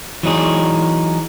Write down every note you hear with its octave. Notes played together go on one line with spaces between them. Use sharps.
E3 F#3 D#4 G#4